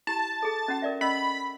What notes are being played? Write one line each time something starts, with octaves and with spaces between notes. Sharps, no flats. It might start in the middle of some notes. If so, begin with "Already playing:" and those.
E4 G4 A5
G#4 A4
C#4 F#4 F#5
A#4 D5 E5
C#4 D#5 B5 E6